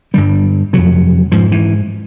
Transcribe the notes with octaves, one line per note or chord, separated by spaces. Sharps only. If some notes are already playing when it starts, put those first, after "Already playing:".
G2 D3 G3
F2 C3 F#3
G#2 F3
E3